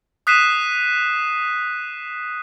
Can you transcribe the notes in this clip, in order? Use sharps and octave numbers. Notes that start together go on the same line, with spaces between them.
D#6 F#6 B6 C7 D#7 E7